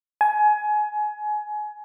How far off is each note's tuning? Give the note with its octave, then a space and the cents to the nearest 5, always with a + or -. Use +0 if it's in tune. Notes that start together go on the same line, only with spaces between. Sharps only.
G#5 +25